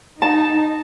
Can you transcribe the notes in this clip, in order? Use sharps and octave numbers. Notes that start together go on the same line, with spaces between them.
D#4 A5